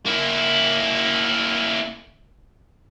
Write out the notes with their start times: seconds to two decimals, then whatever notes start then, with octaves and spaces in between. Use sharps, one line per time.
0.06 A#3 E4